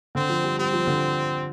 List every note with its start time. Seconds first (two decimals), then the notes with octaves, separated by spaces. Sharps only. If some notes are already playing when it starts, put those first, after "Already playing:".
0.15 D3 C4
0.30 F3
0.44 G3
0.58 G3 C4
0.73 F3
0.87 D3